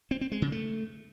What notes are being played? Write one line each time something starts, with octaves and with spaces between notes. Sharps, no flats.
C4
C4
G#3
C#3
A3